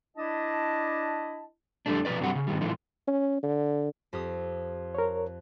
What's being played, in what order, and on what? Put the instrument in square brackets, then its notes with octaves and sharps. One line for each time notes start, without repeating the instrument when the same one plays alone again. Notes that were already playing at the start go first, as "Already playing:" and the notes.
[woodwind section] D4 E4 D#5 A5
[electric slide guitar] F2 D3 D#3 G3 A3 D4
B2 F3 C#4 B4 D5
G2 C3 F#3 G3 F#5
C#3
G#2 D#3 G3
A2 E3 F3 G#3 D#4
[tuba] C#4
D3
[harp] F2 G4 D#6
[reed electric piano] A#4 C#5